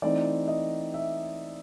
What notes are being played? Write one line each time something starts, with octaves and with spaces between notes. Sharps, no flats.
E3 A3 C4 D#4 D5
D#5
E5